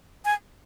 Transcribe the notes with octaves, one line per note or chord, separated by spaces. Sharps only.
G#5